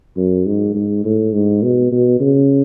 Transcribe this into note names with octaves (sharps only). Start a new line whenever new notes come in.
F#2
G#2
G#2
A2
G#2
B2
B2
C#3